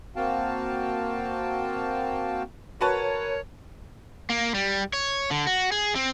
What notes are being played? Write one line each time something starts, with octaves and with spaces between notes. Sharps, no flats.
A#3 C4 F#4 F5 G5 A5
F#4 A#4 B4 C#5 A5
A#3
G3
C#5
D3
F#4
G#4
C4